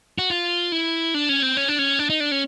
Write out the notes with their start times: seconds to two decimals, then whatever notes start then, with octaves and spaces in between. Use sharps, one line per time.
0.18 F#4
0.30 F4
0.72 E4
1.14 D4
1.29 C#4
1.43 C4
1.57 C#4
1.68 D4
1.79 C#4
1.99 D4
2.10 D#4
2.20 D4
2.31 C#4